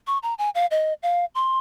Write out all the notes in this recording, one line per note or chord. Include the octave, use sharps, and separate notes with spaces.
C#6
A#5
G#5
F5
D#5
F5
C6